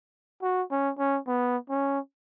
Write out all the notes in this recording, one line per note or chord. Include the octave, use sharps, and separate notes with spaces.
F#4
C#4
C#4
B3
C#4